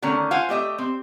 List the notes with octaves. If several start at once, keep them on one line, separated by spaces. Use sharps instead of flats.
D3 D#3 A3 C#4 A#5
F4 C5 F5 F#5 G#5
A3 G4 D#5 E5
C4